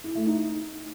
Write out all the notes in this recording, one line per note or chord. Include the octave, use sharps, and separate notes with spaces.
E4
A3
D#4